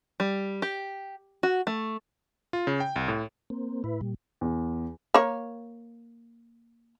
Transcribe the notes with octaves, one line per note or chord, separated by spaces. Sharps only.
G3
G4
F#4
A3
F4
C#3
G5
C2
A2
A#3 C4
A2 E4 B4
A#2 G3
E2
A#3 C#5